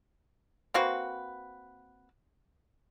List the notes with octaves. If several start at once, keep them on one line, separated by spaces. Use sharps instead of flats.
A#3 C4 F#4 B4